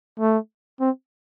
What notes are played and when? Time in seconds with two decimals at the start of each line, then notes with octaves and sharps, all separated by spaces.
0.20 A3
0.81 C4